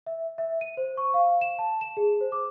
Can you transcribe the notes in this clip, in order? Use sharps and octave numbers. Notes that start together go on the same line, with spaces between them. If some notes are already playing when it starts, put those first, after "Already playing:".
E5
E5
D#7
C5
C#6
F5
E7
A5
E7
G#4
C5
D6